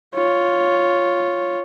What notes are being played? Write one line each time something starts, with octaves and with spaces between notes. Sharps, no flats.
F4 C#5